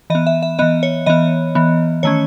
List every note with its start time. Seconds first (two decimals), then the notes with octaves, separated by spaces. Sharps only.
0.10 E3 D#5
0.15 B3
0.27 E5
0.43 E5
0.59 E3 B3 D#5
0.83 C#5
1.06 E3 B3 D#5
1.55 E3 B3
2.03 D#3 A3 C#4 C#5